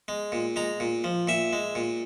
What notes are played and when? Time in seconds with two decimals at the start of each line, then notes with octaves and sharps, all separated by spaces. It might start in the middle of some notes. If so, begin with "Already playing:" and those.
0.08 G#3
0.32 A#2
0.56 G#3 A#5
0.80 A#2
1.04 F3
1.28 A#2 E5
1.53 G#3
1.75 A#2